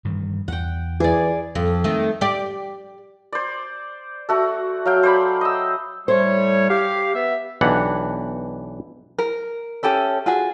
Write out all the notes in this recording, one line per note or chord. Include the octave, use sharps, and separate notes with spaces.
G2 D#3 E3
E2 F#5 G5
E3 G#4 D5
F2
D#3 A3
G4 D5
C5 D5
A3 F#4 A4
F#3 F5 G5
C5 D5 B5
D#5 E6
A2 G3 C5 C#5
G4 F5
B3 E5
B1 E3 D4 G4 F#5
A#4
C#4 G4 A4 E5
F4 F#4 G#4